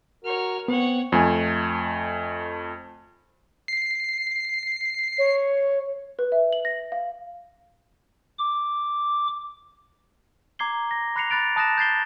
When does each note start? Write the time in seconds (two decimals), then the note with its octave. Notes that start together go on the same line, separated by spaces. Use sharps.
0.24 F#4 A#4 C#5 F6
0.68 B3 C4 C#5 F#5
1.12 F2 A3 G#5
3.68 C7
5.18 C#5
6.19 B4
6.32 E5
6.53 F#7
6.65 A#6
6.92 F5
8.39 D6
10.59 A#5 D6 G#6 C7 G7
10.91 A#6
11.16 B5 F#6 A#6 C7 C#7 F7
11.30 B5 F#6 A6 D7 F7
11.56 A5 D#6 F#6 A6 A#6 E7
11.78 G6 A6 C7 G7